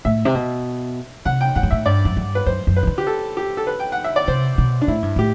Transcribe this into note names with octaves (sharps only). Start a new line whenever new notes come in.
A2 E5
C3
B2
C3 F#5
G5
A2 F#5
G2
A2 E5
G2 D5
F#2
G2
B4
F#2 C5
F#2
B4
C3
D3
G4
A4
G4
A4
B4
G5
F#5
E5
D5
C3 C5
B2
D4
A2 E4
G2
A2 G4